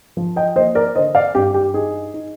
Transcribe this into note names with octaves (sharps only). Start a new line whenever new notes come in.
F3
D#5 G5
A#3 C5 D#5
A#4 D5
D3 C5 D#5
D5 F5
G2 G4
G4
D#4 G#4
D#4